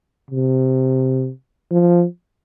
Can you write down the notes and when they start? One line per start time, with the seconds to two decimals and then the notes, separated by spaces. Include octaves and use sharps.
0.31 C3
1.71 F3